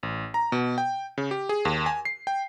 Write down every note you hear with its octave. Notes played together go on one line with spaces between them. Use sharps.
A1
A#5
B2
G5
C#3
G4
G#4
D#2
G#5
C7
G5